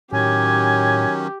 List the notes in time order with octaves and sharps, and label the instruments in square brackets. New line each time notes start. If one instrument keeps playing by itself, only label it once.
[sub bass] A2 [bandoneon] D#3 F#3 C#4 [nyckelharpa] G4 [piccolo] G#5